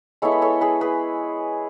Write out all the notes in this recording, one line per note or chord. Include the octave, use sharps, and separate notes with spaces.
G#3 B3 E4 A4 C#5
B4
A4 C#5
G#4 B4
G#4 B4